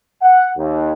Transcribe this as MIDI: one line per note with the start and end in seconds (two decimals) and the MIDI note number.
0.22 0.49 78
0.57 0.92 39